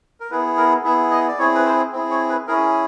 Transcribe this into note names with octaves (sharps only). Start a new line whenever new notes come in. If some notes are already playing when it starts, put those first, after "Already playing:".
A#4
B3 E4 G#4 B4
A#4
B3 E4 G#4 E5
D#5
D5
C4 E4 G#4 C#5
B4
C5
C4 E4 G#4
C#5
B4
C#4 E4 G#4 A#4